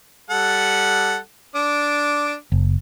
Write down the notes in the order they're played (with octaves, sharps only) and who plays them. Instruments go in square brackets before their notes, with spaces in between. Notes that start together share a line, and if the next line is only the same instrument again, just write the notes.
[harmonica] G3 A4 F#5
D4 D6
[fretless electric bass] F#1